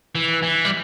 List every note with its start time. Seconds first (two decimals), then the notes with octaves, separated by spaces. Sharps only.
0.15 E3
0.43 E3
0.65 G3